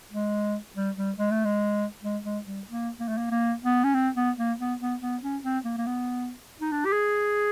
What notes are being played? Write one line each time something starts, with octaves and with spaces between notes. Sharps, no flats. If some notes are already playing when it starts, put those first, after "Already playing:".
G#3
G3
G3
G#3
A3
G#3
G#3
G#3
G3
A#3
A#3
A3
A#3
A#3
B3
C#4
C4
B3
A#3
B3
B3
B3
C#4
C4
A#3
A#3
B3
D#4
D4
G4
G#4